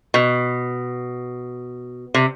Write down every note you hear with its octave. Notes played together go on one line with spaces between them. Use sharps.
B2
C3